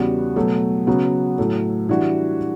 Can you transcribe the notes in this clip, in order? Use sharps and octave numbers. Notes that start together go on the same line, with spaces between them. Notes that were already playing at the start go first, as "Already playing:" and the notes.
Already playing: E2 C#3 G3 B3 F#4
B2 F#3 A3
C#3 F#3 B3 F#4
A2 F#3 A3
E3 G3 D4 F#4